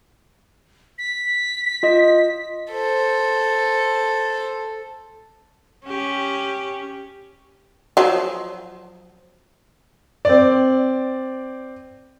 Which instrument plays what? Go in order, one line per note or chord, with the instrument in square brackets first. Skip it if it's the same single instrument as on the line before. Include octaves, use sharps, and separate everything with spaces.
[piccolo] B6
[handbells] F4 D#5
[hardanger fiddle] A4 C5
[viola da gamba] C#4 G4
[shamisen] F3 F#3
[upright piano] C4 D5